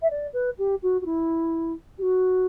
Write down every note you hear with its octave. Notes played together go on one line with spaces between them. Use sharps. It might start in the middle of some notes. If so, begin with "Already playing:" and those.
E5
D5
B4
G4
F#4
F#4
E4
G4
F#4